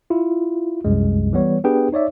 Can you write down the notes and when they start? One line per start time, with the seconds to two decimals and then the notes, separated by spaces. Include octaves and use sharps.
0.10 E4 F4
0.84 C2 F#2 G#3
1.33 E3 G3 B3 C#5
1.64 B3 D4 G4 G#4 B4 G5
1.92 D#4 C#5 D5 E5